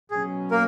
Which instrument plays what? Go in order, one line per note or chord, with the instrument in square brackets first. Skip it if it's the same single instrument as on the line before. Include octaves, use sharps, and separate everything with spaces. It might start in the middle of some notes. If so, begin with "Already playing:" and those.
[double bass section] B2 F#3 C#4 [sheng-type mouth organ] G#4
[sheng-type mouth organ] A#3 A#4